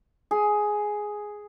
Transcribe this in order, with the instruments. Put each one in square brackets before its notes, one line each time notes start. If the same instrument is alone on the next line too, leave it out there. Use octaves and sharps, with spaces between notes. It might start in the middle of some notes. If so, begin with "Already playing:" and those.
[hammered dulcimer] G#4